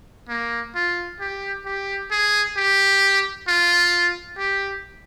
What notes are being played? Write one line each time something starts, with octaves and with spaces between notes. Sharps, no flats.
A#3
F4
G4
G4
G#4
G4
F4
G4